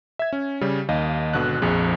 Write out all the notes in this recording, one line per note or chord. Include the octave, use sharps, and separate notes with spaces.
E5 G#6
C#4
C#3 G3
D#2 D#5 F5
G#1 B2 D3 F#4 F#6
A#1 F2 F3 G#4